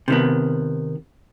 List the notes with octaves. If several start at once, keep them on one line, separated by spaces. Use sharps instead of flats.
C3 D#3 B3